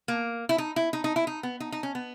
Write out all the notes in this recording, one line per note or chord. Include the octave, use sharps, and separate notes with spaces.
A#3
E4
D#4
E4
D#4
D#4
E4
D#4
B3
D#4
D#4
C#4
B3